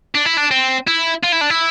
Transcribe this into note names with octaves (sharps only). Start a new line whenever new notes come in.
D4
E4
D4
C4
E4
F4
E4
D4
E4